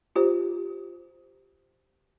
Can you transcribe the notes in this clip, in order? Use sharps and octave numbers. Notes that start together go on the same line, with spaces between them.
F4 G4 C5